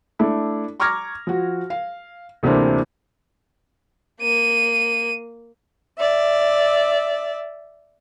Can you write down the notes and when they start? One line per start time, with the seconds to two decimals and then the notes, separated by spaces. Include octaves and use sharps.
0.19 A3 D4 E4
0.80 A#5 C#6 D6 F6 G#6 A#6
1.27 F3 F#4
1.70 F5
2.43 D2 C3 E3 A#3 C4 D4
4.21 A#3 D#7
5.99 D5 E5